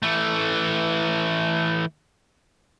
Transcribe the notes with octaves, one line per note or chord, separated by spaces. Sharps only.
E3 A3